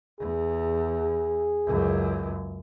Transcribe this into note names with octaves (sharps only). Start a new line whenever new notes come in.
E2 G#4
C#2 F#2